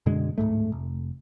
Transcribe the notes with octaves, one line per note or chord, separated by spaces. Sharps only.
F#2 B2 D3 G#3
D1 G#1 G#2 A3
F1